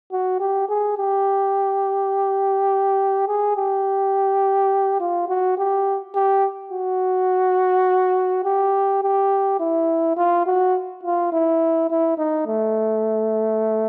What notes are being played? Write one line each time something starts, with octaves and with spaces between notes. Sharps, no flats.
F#4
G4
G#4
G4
G#4
G4
F4
F#4
G4
G4
F#4
G4
G4
E4
F4
F#4
F4
E4
E4
D#4
A3